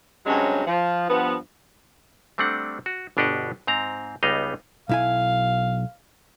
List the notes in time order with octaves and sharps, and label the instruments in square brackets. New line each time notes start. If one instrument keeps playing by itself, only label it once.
[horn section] G2 C3 F#3 G#3 C#4
F3
G2 F3 B3
[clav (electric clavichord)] G3 A3 C4 D4 F#5
F#4
G1 B2 D4 G4 D#5 F#5
G#2 C4 A#5
C#2 G3 B3 D#4 D#5 F5
[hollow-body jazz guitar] B1 E4 G#5 [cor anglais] F5